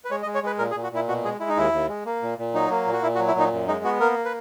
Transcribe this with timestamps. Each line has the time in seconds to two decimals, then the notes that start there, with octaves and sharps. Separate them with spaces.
0.05 B4
0.11 G#3 C#5
0.22 D#5
0.26 G#3
0.35 C#5
0.43 G#3 B4
0.58 A#2 A#4
0.71 G#4
0.75 A#2
0.83 F#4
0.92 A#2 E4
1.08 B2 F#4
1.24 G#3 G#4
1.40 G#3 E4
1.49 D#4
1.57 D#2 E4
1.73 D#2
1.89 G#3
2.05 A#3
2.22 A#2
2.38 A#2
2.54 F#3 D#4
2.71 A#3
2.87 A#2
2.93 F#4
3.03 A#2 E4
3.15 F#4
3.19 F#3
3.28 E4
3.35 A#2 D#4
3.52 F#2
3.68 G#3 D#4
3.85 B3 F#4
4.00 A#3 A#4
4.25 B4